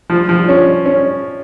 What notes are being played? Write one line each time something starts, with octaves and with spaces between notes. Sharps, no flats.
F3
F3
C#4
C#4